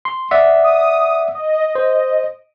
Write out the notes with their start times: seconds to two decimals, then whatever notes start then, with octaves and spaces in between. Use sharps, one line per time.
0.05 C6
0.31 D5 E5 F#5
0.64 D#6
1.35 D#5
1.75 C5